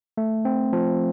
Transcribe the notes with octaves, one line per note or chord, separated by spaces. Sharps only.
A3
C4
F3